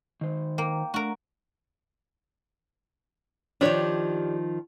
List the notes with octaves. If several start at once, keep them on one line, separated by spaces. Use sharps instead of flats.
D#3 C5
A#3 G5
A3 D4 F#4 A#4
D#3 F3 D4 G4 C#5